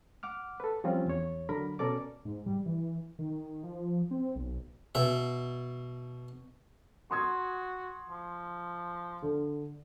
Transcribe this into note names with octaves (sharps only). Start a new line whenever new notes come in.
F#5 D6 F6
A4 B4
F3 G3 C4 C#4 F4
E2 C#5
D3 F#3 A#4 B5
B2 C#4 A4 A#4 D5 D6
G#2
G3
E3
D#3
F3
C4
B1
B2 E5
F#4 C6 D#6 G#6
F3
D3